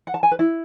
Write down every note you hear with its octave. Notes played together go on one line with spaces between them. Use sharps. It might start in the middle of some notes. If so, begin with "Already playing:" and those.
F#5
A5
G#5
B4
E4